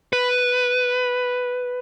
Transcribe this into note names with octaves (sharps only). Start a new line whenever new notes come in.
B4